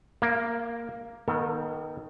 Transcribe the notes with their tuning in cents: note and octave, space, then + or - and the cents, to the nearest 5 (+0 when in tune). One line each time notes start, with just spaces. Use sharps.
A#3 +0 F5 -40
D#3 +0 B3 -40 A4 +40